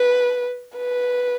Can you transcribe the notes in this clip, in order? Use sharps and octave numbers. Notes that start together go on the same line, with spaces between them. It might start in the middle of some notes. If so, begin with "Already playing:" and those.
Already playing: B4
B4